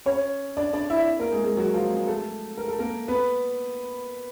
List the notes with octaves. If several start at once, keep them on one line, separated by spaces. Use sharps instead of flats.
C#4 C#5
D4 D5
D4 D5
E4 E5
A#3 A#4
G#3 G#4
G#3 G#4
F#3 F#4
F3 F4
G#3 G#4
A3 A4
A#4
A4
A#3 A#4
B3 B4